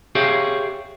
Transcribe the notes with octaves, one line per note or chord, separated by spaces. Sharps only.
G4 G#4 C#5 E5 F5